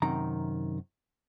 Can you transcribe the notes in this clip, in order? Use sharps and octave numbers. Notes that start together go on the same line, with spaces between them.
F#2 C3 D#3 A#5